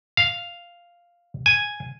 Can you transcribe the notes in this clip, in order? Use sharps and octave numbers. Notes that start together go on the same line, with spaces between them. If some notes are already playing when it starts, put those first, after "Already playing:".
F5
G#5